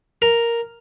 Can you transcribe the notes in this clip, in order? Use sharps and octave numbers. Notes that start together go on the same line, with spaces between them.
A#4